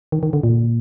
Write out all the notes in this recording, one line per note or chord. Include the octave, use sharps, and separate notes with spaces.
D#3
D#3
D3
A#2